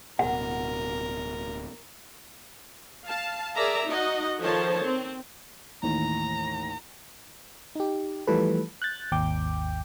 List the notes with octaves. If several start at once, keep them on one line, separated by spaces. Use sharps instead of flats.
D1 B2 A#4 F#5
F5 A5
G#4 A#4 D5 E5 A#5
D#4 F#4 D#5 F#5
D#3 F3 A4 C5 C#5 A5
C4
A1 D#2 A#5
D#4 G4
E3 F3 G3 A3 A4 B4
F#6 G6 A6
G#1 D#2 G5 D6 G6